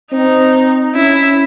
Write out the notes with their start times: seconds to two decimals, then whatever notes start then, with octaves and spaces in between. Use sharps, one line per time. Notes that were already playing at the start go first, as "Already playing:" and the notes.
0.12 C4 D#4
0.95 C#4 E4